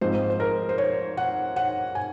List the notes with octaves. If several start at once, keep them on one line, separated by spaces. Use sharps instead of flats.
G#2 F3 C4 C5
C5
A#4
C5
C#5
F#5
F#5
G#5